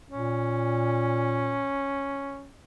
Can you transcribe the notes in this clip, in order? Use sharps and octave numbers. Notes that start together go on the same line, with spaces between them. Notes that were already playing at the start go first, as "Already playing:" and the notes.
A#2 C#4